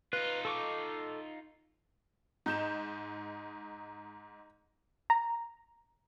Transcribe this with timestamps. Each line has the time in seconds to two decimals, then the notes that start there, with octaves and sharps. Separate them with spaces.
0.13 D#4 F4 B4
0.45 A4 C#6 D6
2.46 G#2 D#4 G6 E7
5.10 A#5